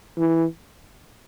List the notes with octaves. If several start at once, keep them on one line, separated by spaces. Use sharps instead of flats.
E3